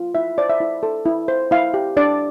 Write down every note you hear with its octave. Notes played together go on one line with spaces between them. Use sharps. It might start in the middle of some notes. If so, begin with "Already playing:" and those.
Already playing: F4
E4 E5
C5 D5
E5
E4
A4
E4
C5
E4 F5
G4
D4 D5